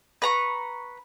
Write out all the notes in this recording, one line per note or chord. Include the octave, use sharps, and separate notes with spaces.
B4 A#5 C#6